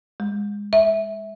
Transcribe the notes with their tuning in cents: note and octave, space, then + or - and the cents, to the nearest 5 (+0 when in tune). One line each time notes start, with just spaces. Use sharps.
G#3 -20
E5 -10